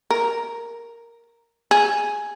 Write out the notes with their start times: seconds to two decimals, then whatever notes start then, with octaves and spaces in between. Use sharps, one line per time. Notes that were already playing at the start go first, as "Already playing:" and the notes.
0.10 A#4
1.71 G#4